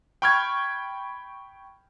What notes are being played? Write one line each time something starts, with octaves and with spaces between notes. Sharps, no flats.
G5 B5 C#6 F6 G6 G#6